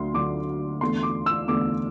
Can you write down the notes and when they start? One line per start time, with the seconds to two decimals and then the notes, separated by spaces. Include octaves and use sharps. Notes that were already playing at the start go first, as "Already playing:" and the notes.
Already playing: D2 D3 F#3 C6
0.14 D2 D3 F#3 D6
0.81 E2 D3 A3 C6
1.03 D6
1.26 E6
1.47 E2 D3 A3 D6